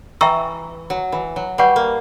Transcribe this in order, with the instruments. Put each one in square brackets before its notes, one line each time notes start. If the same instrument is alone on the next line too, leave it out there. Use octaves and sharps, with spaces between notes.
[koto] E3 [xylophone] E5 G5 A#5 C#6 E6
[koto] F#3
E3
F#3
[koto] G3 [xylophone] B4 D5 F#5 C#6 G6
[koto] A#3